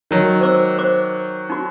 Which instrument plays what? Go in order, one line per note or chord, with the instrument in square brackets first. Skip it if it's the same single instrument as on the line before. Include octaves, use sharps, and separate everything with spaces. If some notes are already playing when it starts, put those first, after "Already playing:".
[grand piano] D#3 F#3
[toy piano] C5 D6 E6
C5 D6
D#4 F#4